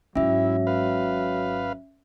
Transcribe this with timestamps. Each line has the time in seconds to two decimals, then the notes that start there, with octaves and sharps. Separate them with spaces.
0.15 G#1 G#2 F#3 C#4 E4 E5
0.67 B4 F5